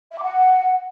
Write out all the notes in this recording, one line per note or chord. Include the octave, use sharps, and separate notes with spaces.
E5
D6
F#5